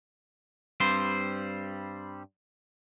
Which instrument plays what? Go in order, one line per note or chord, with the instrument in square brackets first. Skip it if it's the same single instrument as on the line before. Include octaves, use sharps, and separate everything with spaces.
[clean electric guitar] G2 G3 C4 C5